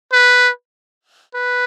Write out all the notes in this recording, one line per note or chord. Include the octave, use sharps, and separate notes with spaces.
B4
B4